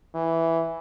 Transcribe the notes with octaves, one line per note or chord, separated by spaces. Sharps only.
E3